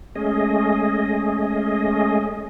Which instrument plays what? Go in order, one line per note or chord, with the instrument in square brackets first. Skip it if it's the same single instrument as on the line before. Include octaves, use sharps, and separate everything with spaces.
[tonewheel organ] G#3 A3 C#4 G#4 D#5